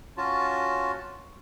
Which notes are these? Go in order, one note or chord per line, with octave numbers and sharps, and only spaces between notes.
C#4 F4 F#4 A5